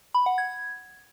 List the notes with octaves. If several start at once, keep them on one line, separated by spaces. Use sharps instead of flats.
B5
F#5
G#6